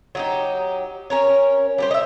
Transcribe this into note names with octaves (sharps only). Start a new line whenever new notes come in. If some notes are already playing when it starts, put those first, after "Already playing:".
F#3 D#4 G4
C#4 A#4 C#5
G3 G4 C5
D#5 E5